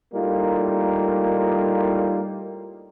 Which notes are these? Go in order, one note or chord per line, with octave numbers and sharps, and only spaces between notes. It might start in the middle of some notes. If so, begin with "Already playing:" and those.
A2 G3 A#3 D#4 F4